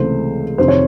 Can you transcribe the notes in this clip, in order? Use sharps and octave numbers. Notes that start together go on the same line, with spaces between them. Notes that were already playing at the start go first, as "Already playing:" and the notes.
Already playing: C#2 C3 E3 A3 C5
F2 C3 D#3 C5
C#5